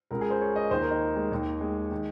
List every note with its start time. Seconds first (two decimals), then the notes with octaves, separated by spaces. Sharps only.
0.11 C#2 C#3 A#4
0.21 G#4
0.30 C5
0.41 C#5
0.56 D#5
0.71 D#2 D#3 C5
0.81 A#4
0.91 D#4
1.16 G#3
1.32 D#2 D#3
1.61 G#3
1.91 D#3